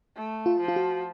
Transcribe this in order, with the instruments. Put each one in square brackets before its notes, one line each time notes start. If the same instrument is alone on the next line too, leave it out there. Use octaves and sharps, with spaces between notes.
[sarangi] A3
[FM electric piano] F4
[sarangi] F3
[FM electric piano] F4
F#4